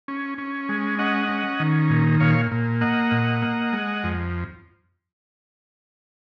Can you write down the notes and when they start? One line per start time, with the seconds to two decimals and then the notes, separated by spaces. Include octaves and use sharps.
0.08 C#4
0.38 C#4
0.69 G#3
0.99 C#4 D#5 F#5
1.29 C#4
1.60 D#3
1.90 A#2
2.20 A#2 C#5 F5
2.51 A#2
2.81 A#3 D#5 F#5
3.11 A#2
3.42 A#3
3.72 G#3
4.04 F2